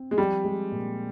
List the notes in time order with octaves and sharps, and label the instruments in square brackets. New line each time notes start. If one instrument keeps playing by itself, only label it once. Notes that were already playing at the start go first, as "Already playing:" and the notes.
Already playing: [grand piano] C4
[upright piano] G#3
[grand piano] F3 [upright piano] G3
[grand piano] G#3
A#2